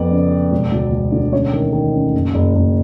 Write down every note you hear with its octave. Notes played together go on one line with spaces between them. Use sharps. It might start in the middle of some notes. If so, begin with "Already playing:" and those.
Already playing: F2 B3 D5
C#3
B3
E1
D2
E1
D3
C#4 C#5
D#3
D#3
C#4
F#1
F#1
F#1